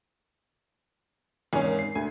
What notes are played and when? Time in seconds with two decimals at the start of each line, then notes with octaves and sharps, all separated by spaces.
1.53 G#1 E2 D#3 C#4 G#5
1.79 C7
1.95 D2 G#5